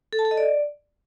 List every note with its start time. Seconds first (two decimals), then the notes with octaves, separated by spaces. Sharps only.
0.13 A4
0.19 A5
0.25 A4
0.31 D#5
0.37 D5